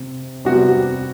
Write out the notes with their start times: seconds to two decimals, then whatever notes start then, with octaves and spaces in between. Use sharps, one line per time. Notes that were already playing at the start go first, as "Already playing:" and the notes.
Already playing: C3
0.45 C3 G3 B3 F#4